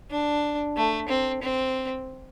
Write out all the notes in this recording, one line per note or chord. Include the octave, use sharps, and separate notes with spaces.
D4
A3
C4
C4